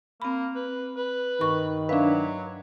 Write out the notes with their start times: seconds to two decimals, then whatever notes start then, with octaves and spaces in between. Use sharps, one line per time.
0.22 A#3 C4 B5
0.56 B4
0.97 B4
1.41 G2 D#3 B5 C#6
1.89 F#3 D4 B4 E5 F5